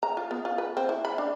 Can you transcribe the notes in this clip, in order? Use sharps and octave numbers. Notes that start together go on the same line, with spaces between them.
A#5
F4
B3
F4
B4
C4
E4
B5
D4